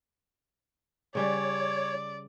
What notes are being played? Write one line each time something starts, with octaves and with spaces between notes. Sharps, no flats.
C#3 G3 C#4 C#5 D5